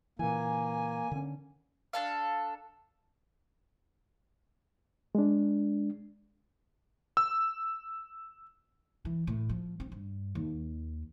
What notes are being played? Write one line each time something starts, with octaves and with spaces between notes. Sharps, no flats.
A#2 C#3 E3 A#3 G#5
D3 C#4
D4 A4 F5
G#3 D4
E6
E3
A2
F3
C4
G2
D#2